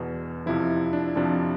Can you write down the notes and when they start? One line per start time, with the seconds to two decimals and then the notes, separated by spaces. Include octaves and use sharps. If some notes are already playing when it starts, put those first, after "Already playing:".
Already playing: E2 B2
0.46 F2 C3 F3 E4
0.93 D4
1.16 F2 C3 F3 D4